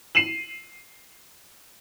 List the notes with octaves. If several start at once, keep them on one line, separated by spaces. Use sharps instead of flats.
C7 D#7 E7 F#7